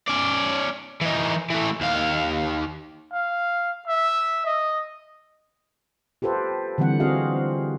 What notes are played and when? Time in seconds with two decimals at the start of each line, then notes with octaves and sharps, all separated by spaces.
0.08 C#4 D5
1.01 E3 D#4
1.50 E3 A3
1.81 D#2 F5
3.12 F5
3.87 E5
4.46 D#5
6.22 F4 G4 A4 B4 C5
6.78 D3 E3 G3 C4 F#5
7.00 C4 F4 F#4 G#4 D#5 F5